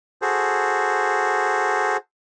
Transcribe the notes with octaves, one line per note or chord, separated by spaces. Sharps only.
F#4 G#4 A4 C5